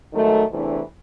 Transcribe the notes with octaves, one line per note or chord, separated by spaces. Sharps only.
G#2 D#3 F#3 A3
E2 C3 E3 A3 D4